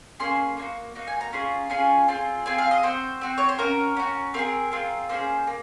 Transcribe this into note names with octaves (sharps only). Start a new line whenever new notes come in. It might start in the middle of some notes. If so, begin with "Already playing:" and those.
A#3 C#4 G#4 C6
A#3 D#4
F#4
A#3 D#4 F#4
G#5
A#5
C#4 F4 G#4
C#4 F4 G#4 G#5
C4 F4 G#4
C4 F4 G#4 G#5
F5
D#5
C4 F#4 C5
C4 F#4
C#5
C5
C#4 F#4 A#4
C#4 F#4
C4 F4 G#4 A#4
C4 F4 G#4
A#3 C#4 G#4 C5
A#3